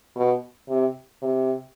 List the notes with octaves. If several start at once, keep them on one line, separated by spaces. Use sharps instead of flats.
B2
C3
C3